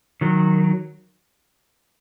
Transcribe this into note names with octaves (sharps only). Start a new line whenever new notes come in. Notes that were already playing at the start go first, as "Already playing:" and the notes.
D#3 F#3